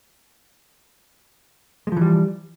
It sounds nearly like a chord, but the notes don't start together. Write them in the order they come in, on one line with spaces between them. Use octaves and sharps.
G#3 F3 E3 G3